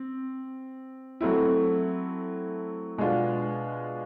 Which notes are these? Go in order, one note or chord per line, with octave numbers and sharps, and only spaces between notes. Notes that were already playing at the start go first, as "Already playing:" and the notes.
Already playing: C4
F#3 A3 C4 E4
B2 G#3 B3 D4 F4